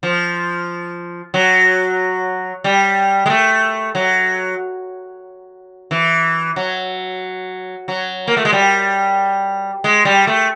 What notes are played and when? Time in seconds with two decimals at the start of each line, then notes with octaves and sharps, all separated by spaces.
0.03 F3
1.34 F#3
2.64 G3
3.26 G#3
3.30 A3
3.95 F#3
5.91 E3
6.56 F#3
7.88 F#3
8.28 A#3
8.37 A3
8.45 G#3
8.53 G3
9.84 G#3
10.05 G3
10.27 A3